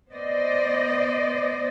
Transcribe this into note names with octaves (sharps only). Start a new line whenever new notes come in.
B3 C5 D5 D#5